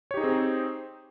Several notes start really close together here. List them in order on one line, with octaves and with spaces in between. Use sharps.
C#5 G4 D#4 G#4 C4